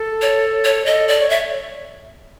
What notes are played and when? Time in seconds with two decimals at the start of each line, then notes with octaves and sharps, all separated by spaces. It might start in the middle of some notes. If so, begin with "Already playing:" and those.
Already playing: A4
0.22 C#5
0.65 C#5
0.86 A4 D#5
1.08 D5
1.20 C#5
1.30 E5